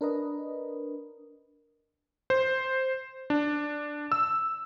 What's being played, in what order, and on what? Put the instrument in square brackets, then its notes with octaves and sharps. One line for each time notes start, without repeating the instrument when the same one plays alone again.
[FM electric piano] D4 A#4 B4 D#5
[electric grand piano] C5
D4
E6